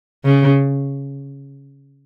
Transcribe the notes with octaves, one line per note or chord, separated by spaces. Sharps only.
C#3